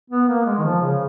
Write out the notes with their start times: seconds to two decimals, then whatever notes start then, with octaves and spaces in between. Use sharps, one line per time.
0.10 B3
0.28 A#3
0.46 G#3
0.58 D#3
0.64 F3
0.81 C#3